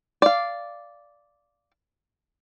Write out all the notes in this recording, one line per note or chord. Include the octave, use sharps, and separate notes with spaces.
D5 F5